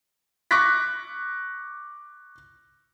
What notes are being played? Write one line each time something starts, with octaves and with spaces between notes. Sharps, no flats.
C#6 D6 F#6 A#6 B6